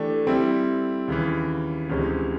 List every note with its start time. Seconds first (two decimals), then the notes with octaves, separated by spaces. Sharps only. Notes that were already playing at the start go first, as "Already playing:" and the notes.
Already playing: E3 A3 D4 G4
0.27 G3 C4 E4
1.08 D#2 C#3 E3
1.89 D2 C3 E3 G#3 C#4